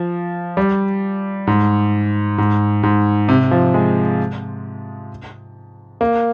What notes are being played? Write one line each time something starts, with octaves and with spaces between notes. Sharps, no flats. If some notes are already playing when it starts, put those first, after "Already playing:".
Already playing: F3
G3
G#2
G#2
G#2
C3
F3
G#3
A#3